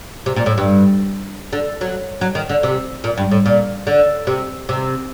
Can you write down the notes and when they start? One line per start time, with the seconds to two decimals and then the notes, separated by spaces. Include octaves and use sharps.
0.26 C3
0.36 A#2
0.46 A2
0.58 G2
1.53 D3
1.81 F#3
2.21 F#3
2.35 D#3
2.49 D3
2.63 C3
3.04 A#2
3.17 G2
3.31 A2
3.46 A#2
3.87 D3
4.27 C3
4.69 C3